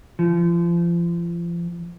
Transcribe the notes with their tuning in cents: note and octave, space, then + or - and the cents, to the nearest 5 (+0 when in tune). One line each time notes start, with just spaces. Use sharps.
F3 -35